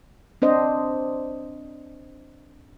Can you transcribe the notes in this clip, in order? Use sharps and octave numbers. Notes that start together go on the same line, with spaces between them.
C4 D4 C5 D#5